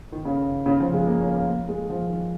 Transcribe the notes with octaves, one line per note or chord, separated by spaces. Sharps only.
D#3
C#3
C#3
F3
G#3
A#3
C#4
A#3
A#3
G#3
F3
D#3